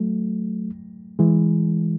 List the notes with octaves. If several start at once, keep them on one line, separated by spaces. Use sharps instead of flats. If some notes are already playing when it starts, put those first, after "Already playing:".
Already playing: F#3 A3
E3 G#3